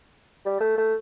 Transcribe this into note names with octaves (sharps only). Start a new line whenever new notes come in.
G3
A3
A3